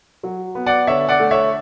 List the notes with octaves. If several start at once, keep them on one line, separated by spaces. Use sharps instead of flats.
F#3
B3
D5 F#5
D3 C#5 E5
D5 F#5
A3
C#5 E5